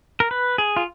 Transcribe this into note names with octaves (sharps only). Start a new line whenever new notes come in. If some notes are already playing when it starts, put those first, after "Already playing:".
A#4
B4
G#4
F4